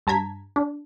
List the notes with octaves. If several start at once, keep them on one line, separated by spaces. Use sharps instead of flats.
G2 A5 A#5 G#6 B6
D4